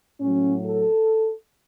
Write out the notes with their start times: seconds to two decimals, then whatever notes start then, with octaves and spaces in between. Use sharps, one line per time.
0.20 A2 F#3 C#4
0.66 A4